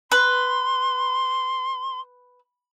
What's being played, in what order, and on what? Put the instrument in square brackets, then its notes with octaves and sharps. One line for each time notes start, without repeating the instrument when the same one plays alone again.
[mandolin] B4 [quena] C6